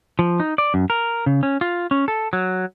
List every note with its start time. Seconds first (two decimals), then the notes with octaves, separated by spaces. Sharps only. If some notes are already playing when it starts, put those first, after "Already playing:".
0.19 F3
0.40 D#4
0.58 D5
0.74 F#2
0.90 A#4
1.26 C#3
1.43 C#4
1.61 F4
1.91 C#4
2.08 A4
2.33 F#3